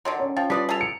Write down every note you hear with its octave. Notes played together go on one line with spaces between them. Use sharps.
D3 D#3 F#3 C6
C#4
F3 F5 G5 A6
G3 D4 F4 A4 B4 D5 D#6 B6
G#4 A4 A#5 A6 F7
C#7